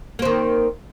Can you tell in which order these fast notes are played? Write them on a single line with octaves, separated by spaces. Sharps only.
A#3 C4 D#3